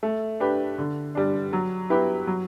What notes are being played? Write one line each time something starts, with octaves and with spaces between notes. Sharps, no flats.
A3
D4 G4 B4
D3
G3 D4
F#3
B3 E4 G4 B4
F#3